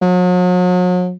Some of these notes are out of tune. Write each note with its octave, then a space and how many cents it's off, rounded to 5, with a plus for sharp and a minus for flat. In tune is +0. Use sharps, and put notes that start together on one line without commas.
F#3 -40